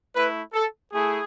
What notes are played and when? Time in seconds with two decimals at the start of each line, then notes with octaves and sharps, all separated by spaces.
0.14 A3 E4 B4
0.53 A4
0.92 A3 E4 G#4